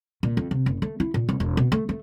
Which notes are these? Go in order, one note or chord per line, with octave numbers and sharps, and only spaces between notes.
A#2
F2
C3
F#1
A3
E4
A#2
C2
E1
B2
A3
A3